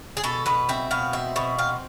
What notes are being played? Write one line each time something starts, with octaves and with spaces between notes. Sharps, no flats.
G#4
B2 A4
B2 B4
C4 E5
B2 F5
C4 E5
B2
C4 F5